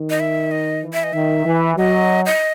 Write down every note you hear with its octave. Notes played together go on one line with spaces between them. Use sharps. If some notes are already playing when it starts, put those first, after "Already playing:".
Already playing: D#3
D#5
E5
D#5
E3
E5
D#5
D#3 E5
E3
F#3 D#5
D#5